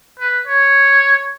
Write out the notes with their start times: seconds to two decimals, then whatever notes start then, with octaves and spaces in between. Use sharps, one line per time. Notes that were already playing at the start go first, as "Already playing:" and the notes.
0.19 B4
0.47 C#5